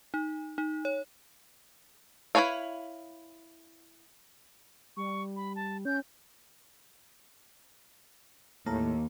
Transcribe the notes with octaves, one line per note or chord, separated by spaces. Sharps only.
D#4
D#4
C#5
E4 F#4 B4 C#5 F5
G3 C#6
B5
A5
C#4 G6
D#2 A2 A#3 A5 A#5